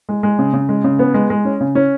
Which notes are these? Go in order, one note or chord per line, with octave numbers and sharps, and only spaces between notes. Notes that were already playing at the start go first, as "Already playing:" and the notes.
G#3
G#3
C#3
C#3
G#3
C#3
B3
G#3
G#3
C#4
C#3
C#4